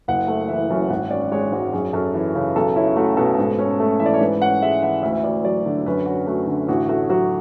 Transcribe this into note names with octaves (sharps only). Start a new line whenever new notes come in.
F#1 F#5
A3
E3 E5
F#2
G#1 F#5
C#4 D5
G#3 C#5
G#2 F#4
F#2 G#4
F#2 A4
E3 C#5
C#3 B4
B1 A4
C#4 E4
A3 F#4
B2 A4
G#2
C#4
A3
E3 E5
D5
C#5
G#2 B4
C#4 F#5
G#3 E5
E3 F#5
D2 E5
E5
D2 D5
F#3 D5
D3
F#2 B4
C#4 F#4
A3 F#4
D3
A1 F#4
A3 F#4
F#3 F#4